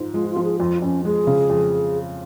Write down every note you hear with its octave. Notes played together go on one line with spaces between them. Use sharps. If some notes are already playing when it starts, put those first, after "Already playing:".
Already playing: G#2 F3
G#3 F4
F4
F3
G#4
F2 F4
F2 C#4
G#3 G#4
C#3
F2